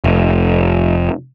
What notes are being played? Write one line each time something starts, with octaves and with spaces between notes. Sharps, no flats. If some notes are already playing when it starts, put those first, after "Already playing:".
F1